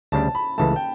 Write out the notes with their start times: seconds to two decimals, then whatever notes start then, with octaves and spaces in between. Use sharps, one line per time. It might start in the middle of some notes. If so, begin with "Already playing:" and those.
0.12 D2 C#3 G3 D4 A5
0.35 B5
0.58 C#2 C#3 E3 A3 A5
0.76 G5